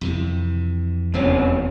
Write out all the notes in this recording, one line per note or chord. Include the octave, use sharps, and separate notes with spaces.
F2 C3 E3
F1 E2 G2 E3 C4 C#4